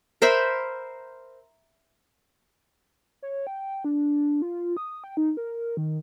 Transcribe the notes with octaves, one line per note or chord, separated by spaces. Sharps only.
A#4 C5 E5 B5
C#5
G5
D4
F4
D#6
G5
D#4
A#4
D#3